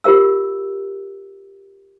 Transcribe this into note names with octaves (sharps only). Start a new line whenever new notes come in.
F4 G4 A#4 F5 E6